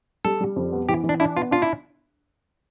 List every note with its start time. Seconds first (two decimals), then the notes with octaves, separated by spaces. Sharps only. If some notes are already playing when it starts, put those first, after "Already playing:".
0.25 G3 A4
0.41 G3
0.56 F2
0.72 B3
0.89 E3 G4
1.04 E3
1.09 D4
1.20 D4 E4
1.36 B3 F4
1.51 D4 F4
1.62 E4